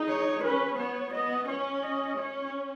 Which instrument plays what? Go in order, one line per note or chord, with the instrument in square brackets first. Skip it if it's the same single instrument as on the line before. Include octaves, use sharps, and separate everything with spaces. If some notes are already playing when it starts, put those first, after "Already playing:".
Already playing: [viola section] D#4 G#4
[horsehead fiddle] C#5
[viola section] C#4 [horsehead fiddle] B4
[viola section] B3 [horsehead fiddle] C#5
[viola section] B3 [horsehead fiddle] D#5
[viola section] C#4 [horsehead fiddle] C#5
[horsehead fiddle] D#5
[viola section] C#4 [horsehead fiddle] C#5